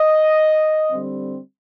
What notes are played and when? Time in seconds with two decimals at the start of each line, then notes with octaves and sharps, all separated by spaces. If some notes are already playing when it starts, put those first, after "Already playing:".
Already playing: D#5
0.92 D3 G3 C4